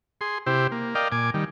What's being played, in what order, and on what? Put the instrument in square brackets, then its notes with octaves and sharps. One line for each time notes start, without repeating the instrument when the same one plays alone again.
[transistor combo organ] G#4 C6
C3 E4 G4 C5
A#3
A#4 D5 D#5 F5 G5
A#2 G#5 D6
D#3 G3